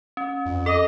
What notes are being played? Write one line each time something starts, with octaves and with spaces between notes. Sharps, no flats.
C#4
F2
A4 D#5 D6